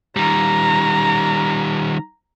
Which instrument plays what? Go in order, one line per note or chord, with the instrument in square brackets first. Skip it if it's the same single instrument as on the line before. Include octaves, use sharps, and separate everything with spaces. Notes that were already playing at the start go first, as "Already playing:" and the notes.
[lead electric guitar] D#3 G3 [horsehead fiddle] A#5